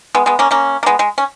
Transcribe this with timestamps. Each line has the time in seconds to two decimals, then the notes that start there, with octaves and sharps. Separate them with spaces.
0.15 G#3 B3
0.26 G#3 B3
0.39 A#3 C#4
0.51 A#3 C#4
0.83 A#3
0.86 G#3 B3
0.99 G#3
1.18 C#4